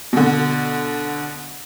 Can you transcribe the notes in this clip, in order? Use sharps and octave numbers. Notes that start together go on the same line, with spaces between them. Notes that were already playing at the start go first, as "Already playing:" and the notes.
B2 D3